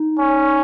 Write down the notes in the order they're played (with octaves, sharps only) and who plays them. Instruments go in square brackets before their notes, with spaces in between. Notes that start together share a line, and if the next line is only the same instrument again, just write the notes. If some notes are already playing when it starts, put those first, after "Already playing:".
Already playing: [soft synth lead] D#4
[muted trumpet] C#4